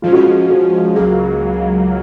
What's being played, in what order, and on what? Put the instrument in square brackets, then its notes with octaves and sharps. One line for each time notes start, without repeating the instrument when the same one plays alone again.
[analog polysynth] G#2 F3 G#3 C#4 [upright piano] F4
[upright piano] F#4
F4
F#4
[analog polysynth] C#2 C#3 F#3 A#3 [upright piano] G#4